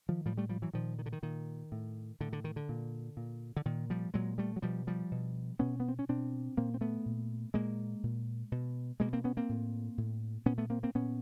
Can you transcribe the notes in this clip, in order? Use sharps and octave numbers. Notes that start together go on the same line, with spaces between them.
D#3 F3
A2 F3 G3
G3 A3
F3 G3
E3 F#3
A#2 D#3 F3
D#3
D3
D#3
A#2 D#3
A2
A2 D3
D3
D#3
D3
A#2
A#2
D3
A#2 D#3
F3 G3
A#2 F#3 G#3
G3 A3
F#3
B2 F3 G3
F3 G3
B2
B2 B3 C#4
B3
C4
C#4
B2 C4 D4
A#2 A#3 C4
C4
A3 B3
A#2
A#2 G#3 A#3
A#2
B2
B2 G#3 A#3
A#3 C4
B3 C#4
A#3 C4
A2
A2
A#2 B3 C#4
A3 B3
A#3 C4
A#3 C4
A#2 B3 C#4